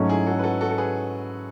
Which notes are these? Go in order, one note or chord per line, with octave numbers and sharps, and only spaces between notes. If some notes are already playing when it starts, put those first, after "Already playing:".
Already playing: G#2 F#3 A3 C#4
E4 G#4
F#4 A4
B4
F#4 A4
F#4 A4
A4
G#4 B4